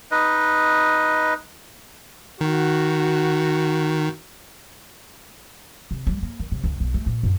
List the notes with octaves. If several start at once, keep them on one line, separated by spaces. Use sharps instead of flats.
D#4 B4 D#5
D#3 F#4
C3
G3
A#3
D#3
C3
C#2
B1
A3
A#2
F#2